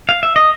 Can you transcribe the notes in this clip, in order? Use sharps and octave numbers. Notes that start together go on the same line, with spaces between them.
F5
E5
D#5